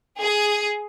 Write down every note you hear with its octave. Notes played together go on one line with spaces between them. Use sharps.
G#4